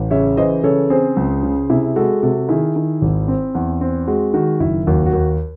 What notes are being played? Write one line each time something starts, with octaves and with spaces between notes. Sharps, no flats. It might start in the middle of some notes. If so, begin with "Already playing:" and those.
Already playing: A1
C#3 C#5 E5
E3 C5 D#5
C#3 A4 C#5
C4 G#4 C5
C#2
C#3
C3 E4 G#4
G#3 F#4 A4
C3 F#4 A4
D#3 E4 G#4
D#3
G#1
C4
E2
C4
G#3 F#4
D#3 F#4
F#1 E4
D#2 F#4
F#4
D#2